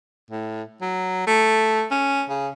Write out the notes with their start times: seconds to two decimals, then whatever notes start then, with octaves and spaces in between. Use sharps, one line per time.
0.31 A2
0.82 F#3
1.27 A3
1.91 C#4
2.29 C#3